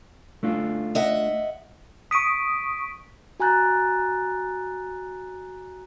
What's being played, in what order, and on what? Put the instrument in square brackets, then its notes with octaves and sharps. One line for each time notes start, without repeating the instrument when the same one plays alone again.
[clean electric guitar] A3 D4 F4
[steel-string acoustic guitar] D#5 E5 F#5
[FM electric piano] C#6 D#6 [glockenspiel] B6 D7 D#7
[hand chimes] F#4 G#5 A#5 F#6 G6 A6